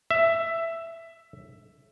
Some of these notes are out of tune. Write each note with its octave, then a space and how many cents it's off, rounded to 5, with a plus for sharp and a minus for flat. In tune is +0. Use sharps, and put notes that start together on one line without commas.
E5 +10